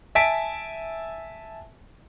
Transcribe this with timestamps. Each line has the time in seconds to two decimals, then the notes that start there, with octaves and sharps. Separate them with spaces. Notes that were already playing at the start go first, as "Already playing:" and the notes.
0.15 E5 G#5 A5 B6 D7